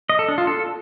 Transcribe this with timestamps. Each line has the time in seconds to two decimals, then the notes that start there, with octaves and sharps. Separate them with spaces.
0.09 D#5
0.19 A4
0.28 D4
0.38 F4
0.47 A4